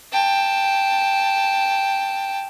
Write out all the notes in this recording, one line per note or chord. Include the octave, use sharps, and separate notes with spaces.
G5 A5